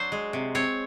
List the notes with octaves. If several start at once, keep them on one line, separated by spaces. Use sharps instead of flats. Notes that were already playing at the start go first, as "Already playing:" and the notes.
Already playing: F#3 D4 C5
G#3
C3
C4 C#5